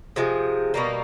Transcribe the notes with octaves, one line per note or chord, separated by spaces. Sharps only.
C3 F3 G#3
B2 G3 A#3